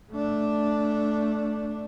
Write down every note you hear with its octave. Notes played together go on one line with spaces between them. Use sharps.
A3 D4